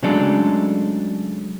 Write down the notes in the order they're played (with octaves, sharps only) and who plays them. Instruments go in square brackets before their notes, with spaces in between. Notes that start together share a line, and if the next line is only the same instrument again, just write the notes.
[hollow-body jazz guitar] C#3 F#3 G#3 A3 D4 A4